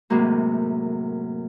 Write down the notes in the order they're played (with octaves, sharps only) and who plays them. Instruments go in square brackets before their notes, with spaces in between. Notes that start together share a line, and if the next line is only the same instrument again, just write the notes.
[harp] F#2 A2 C3 G#3 A#3 F#4